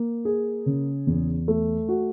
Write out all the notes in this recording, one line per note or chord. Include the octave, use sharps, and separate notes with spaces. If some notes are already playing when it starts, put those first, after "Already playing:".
Already playing: A#3
G#4
C#3
E2
A3
F#4